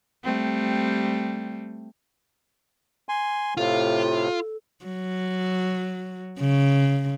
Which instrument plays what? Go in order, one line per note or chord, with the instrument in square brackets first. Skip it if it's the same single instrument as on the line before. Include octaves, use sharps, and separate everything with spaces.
[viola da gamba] G3 A3 C4
[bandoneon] G#5 C6
[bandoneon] A2 C3 [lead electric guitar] F4 [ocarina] A4
[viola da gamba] F#3
C#3